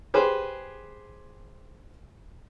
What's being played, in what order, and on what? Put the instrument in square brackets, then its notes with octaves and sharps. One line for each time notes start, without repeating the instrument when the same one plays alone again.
[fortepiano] G4 G#4 B4 C5